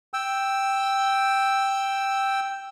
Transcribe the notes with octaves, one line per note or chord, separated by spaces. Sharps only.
G5 E6